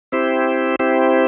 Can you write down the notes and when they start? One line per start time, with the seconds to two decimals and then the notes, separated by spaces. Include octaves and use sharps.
0.12 C4 E4 G4 C5
0.79 C4 E4 G4 C5